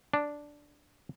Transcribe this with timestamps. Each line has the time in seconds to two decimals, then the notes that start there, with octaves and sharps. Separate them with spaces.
0.14 D4